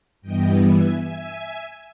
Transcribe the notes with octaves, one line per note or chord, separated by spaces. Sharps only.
G2 E3 G3 B3 D#5 G5
E5 G#5
E5 G#5